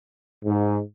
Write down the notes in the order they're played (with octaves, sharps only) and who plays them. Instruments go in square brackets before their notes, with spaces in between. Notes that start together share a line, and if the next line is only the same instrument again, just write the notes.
[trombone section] G#2